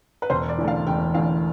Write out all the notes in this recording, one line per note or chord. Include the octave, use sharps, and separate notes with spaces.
B4
E1 C5
D5
E2 D3 A3
F5
E1 G5
E2 D3 A3 F5